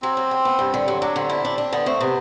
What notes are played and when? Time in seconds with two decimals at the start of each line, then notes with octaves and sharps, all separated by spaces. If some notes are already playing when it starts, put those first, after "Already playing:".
0.02 F#3 C4
0.17 F#3
0.31 E2
0.45 B3
0.59 G2
0.74 D3
0.88 F#3
1.02 F#3 D4
1.15 D3 C4
1.29 E4
1.45 D4
1.58 D4
1.73 D3 B3
1.86 A3 C4
2.00 C3 B3